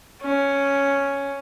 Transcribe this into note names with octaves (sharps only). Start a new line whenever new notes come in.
C#4